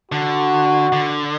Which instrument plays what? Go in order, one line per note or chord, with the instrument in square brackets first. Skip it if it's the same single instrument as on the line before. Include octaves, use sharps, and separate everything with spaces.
[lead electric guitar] D3 [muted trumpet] F#4
[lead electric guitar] D3